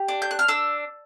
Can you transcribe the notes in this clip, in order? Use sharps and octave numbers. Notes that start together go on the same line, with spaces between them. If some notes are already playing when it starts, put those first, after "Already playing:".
Already playing: G4
D4
G6
F#6
F6
D4 E6